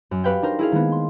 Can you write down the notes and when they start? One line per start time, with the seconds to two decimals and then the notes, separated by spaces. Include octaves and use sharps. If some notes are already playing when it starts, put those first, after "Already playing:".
0.11 F#2
0.24 F#4 G4 B4 F5 G5
0.42 D4 D#4 A#4 C5
0.59 E4 G#4 F5
0.72 D#3 G#3 A#3 B3
0.92 C6